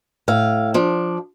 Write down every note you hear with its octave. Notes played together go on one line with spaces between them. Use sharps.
A2 F5
F3 D4